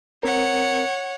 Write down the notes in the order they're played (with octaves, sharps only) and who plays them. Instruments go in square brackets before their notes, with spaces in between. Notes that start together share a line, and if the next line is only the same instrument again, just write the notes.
[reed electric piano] C4 A#4 [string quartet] C#5 F#5